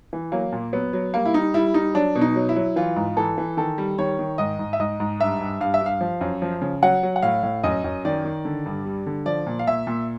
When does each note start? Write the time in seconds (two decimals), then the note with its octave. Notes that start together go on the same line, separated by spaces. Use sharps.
0.13 E3
0.32 F#3 A#3
0.52 A#2
0.73 F#3 B3
0.93 F#3
1.14 G3 A#3
1.25 E4
1.34 G3 D#4
1.54 G3 E4
1.74 G3 D#4
1.94 F#3 D4
2.15 B2
2.21 D#4
2.36 F#3
2.49 E4
2.56 F#3
2.76 E3 F4
2.96 G#2
3.17 E3 A4
3.38 E3
3.57 D#3 A4
3.78 G3
3.99 D#3 C#5
4.19 D#3
4.38 G#2 D#5
4.59 G#2
4.73 E5
4.80 G#2 D#5
5.00 G#2
5.20 G2 E5
5.41 G2
5.60 G2 F5
5.74 E5
5.81 G2
5.86 F5
6.01 F3
6.21 F#2
6.42 F3
6.62 C#3
6.83 F#3 F#5
7.03 F#3
7.16 F#5
7.22 A2 F5
7.43 A2
7.63 F#2 D#5
7.84 F#2
8.05 D#3 D5
8.25 D#3
8.45 D3
8.66 G2
8.85 G3
9.06 D3
9.26 F3 D5
9.46 A#2
9.59 F5
9.67 A#2 E5
9.87 A#2